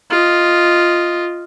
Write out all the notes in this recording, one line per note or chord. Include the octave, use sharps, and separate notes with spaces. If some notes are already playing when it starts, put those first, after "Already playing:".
F4 D#5